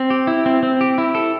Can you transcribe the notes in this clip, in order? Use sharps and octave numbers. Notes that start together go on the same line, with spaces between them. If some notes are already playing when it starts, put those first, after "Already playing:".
Already playing: C4
G4
E4
C4
C4
G4
E4
A4